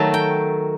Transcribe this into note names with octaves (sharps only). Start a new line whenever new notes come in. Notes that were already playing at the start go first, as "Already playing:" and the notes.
Already playing: D#3 F#3 A3 A5
G5